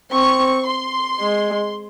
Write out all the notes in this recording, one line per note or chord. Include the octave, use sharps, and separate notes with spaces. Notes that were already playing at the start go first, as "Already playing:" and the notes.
C4 C#6
C6
G#3